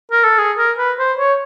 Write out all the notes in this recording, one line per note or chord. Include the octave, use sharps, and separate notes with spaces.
A#4
A4
G#4
A#4
B4
C5
C#5